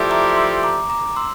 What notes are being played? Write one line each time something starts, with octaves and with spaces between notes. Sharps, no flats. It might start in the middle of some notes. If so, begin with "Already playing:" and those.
Already playing: F3 A3 E4 G4 D5
A#5 D6
C6 E6
A#5 D6
A#5 D6
C6 E6